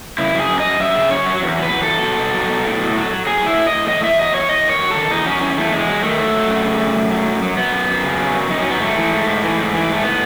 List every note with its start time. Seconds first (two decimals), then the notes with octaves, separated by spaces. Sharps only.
0.18 C#3 E4
0.34 F#2
0.40 G#4
0.49 F#2
0.60 D#5
0.65 F#2
0.80 F#2 E5
0.95 C#3
1.10 F#2 C#5
1.26 F#3
1.42 E2
1.57 F#3
1.62 B4
1.72 E2
1.83 A4
1.88 F#3
2.03 B2
2.19 B2
2.34 F#3
2.50 B2
2.65 A2
2.80 F#3
2.96 F#3
3.11 F#3
3.26 F#3 G#4
3.41 A2
3.46 E4
3.57 A2
3.67 D#5
3.72 A2
3.87 E2 D#5
4.04 E2 E5
4.19 F#3 D#5
4.34 E2 C#5
4.49 E2 D#5
4.65 D#3 C#5
4.81 F#3
4.91 A4
4.96 D#3
5.11 E2 D#4
5.26 F#3 C#4
5.41 E2 C#4
5.57 E2 A3
5.72 E2 G#3
5.88 F#3
6.03 D#3 A3
6.19 F#3
6.34 F#3
6.49 F#2
6.65 C#3
6.80 F#2
6.96 F#2
7.11 F#3
7.26 F#2
7.42 F#3
7.57 F#3 B3
7.72 F#2
7.89 F#2
8.04 C#3
8.18 F#3
8.35 F#2
8.50 F#2 D#4
8.60 C#4
8.65 F#3 B3
8.80 G#2 A3
8.96 E3
9.11 G#2
9.26 G#2
9.43 E3
9.57 G#2
9.73 E3
9.88 G#2 A3
10.03 A2 B3